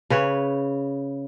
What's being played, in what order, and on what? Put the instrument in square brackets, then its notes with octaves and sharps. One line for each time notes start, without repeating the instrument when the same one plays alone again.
[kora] C#3 B4 C#5